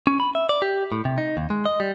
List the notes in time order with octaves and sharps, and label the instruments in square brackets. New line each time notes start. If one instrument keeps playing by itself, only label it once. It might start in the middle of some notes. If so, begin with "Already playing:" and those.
[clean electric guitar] C#4
B5
E5
D5
G4
A2
C3
D#4
D#2
G#3
D#5
G3